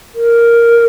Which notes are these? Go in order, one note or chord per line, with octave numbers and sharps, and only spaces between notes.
A#4